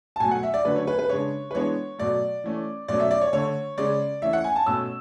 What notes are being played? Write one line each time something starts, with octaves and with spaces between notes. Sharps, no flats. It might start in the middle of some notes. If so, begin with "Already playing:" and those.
A5
B2 F#3 A3 G#5
F#5
E5
D5
D3 F#3 A3 C#4 B4
C#5
B4
B4
C#3 G#3 D4 C#5
B4
E3 G#3 B3 D4 C#5
B2 F#3 A3 D5
E3 A3 C#4
B2 F#3 A3 C#4 D5
E5
D5
C#5
D3 A3 D4 C#5
C#3 G#3 C#4 D5
E3 A3 C#4 E5
F#5
G#5
A5
B2 A3 C#4 E6